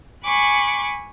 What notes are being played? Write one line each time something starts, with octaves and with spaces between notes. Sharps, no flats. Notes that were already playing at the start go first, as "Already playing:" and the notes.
G#5 B5 C#6 D6 F#6